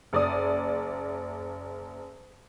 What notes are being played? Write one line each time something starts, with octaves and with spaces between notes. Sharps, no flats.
F#1 D5 D#6